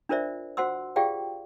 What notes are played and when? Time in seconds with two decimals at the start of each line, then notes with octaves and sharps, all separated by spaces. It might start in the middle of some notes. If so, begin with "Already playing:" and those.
0.09 D4 F4 A#4 C5 D5 E5
0.57 F#4 C5 F#5 C6 E6
0.96 F4 G4 G#4 D5 F5 G5